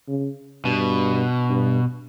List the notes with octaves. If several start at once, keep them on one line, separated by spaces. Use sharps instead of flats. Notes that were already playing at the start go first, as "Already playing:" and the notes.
C#3
G2 B2
G2